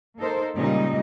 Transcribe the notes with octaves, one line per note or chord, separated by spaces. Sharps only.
A#3 D#4 A4 A#4 C5
A#2 C#3 G3 G#3 D#4 D#5